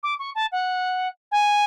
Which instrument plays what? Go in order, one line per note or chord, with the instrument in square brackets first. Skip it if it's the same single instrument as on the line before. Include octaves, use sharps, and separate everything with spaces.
[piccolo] D6
C#6
A5
F#5
G#5